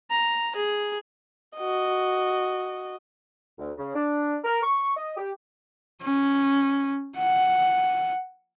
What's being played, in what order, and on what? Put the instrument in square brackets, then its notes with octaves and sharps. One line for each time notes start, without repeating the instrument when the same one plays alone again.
[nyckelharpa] A#5
G#4
[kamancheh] F#4 D#5
[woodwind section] D2
C#3
D4
A#4
C#6
D#5
G4
[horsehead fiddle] C#4
F#5